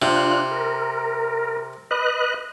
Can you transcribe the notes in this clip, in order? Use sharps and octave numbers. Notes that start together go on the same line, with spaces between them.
C3 D4 F4 F#6
A#4
B4 D#5 F#6